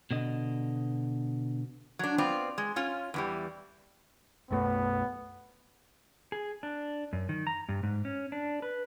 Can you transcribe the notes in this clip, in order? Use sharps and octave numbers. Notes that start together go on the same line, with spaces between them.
B2 D3 D#5
F#3 D4
B3 C4 F4 D5
G#3
C#4 F4
E2 E3 G3
B1 F#2 A3 B3
G#4
D4
F#2
D#3
A#5
G2
G#2
C#4
D4
B4